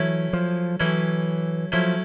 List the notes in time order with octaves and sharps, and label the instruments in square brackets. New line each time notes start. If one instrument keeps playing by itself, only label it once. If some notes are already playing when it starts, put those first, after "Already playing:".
Already playing: [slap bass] E3 [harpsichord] F#3 A3 C#4 E4
[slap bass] F3
[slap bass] E3 [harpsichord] F#3 A3 C#4 E4
[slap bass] F3 [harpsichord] F#3 A3 C#4 E4